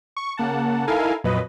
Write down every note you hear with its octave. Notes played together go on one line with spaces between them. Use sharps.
C#6
C#3 A#3 F#5 A5
D#4 E4 A4 A#4 F5 G#5
F2 A#2 F#3 B4 D#5